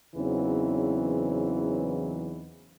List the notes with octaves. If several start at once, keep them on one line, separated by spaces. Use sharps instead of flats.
E2 C#3 E3 F#3 C4 D#4